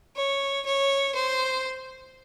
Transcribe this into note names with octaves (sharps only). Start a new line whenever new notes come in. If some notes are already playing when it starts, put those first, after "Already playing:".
C#5
C#5
C5